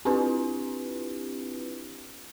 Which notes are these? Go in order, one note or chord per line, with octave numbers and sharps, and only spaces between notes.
C4 D4 E4 F4 G4 B4